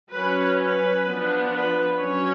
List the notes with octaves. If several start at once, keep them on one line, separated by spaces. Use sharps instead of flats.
F#3 C#4 B4
B4
F3 B3 D4
B4
F#3 C#4 C#5